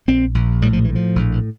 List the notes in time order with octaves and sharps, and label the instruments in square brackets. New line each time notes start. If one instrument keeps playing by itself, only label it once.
[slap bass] A#1 C4
A#1
A2 G3
F3
A2 E3
F3
A#1